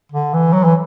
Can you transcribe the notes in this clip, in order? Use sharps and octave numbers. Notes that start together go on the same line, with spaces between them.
D3
E3
F#3
E3